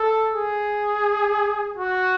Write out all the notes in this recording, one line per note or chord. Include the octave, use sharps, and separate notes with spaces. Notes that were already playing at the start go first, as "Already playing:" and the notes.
Already playing: A4
G#4
F#4